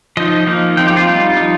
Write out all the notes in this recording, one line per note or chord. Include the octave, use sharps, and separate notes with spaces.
F3 D#4 D#5
F3 A#3 D#4
F3 C4 D#4 G5
G4
F4
G3 D#4
F3 D#4